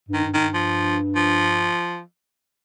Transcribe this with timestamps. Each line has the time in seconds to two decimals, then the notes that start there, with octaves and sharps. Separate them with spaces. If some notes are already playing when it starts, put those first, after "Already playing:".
0.09 G2 D#3
0.24 G2
0.34 G2 D#3
0.54 F3
1.16 F3